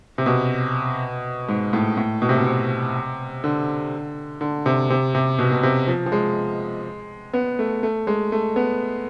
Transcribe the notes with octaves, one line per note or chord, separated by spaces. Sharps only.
C3
B2
G#2
A2
A2
B2
C3
B2
C3
D3
D3
C3
C3
C3
B2
B2
C3
F3
F3
G#3
B3
A3
A3
G#3
A3
B3